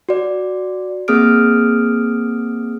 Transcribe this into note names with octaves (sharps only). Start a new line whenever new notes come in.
F#4 D5
A#3 C4 G#4 D#6 F6 D7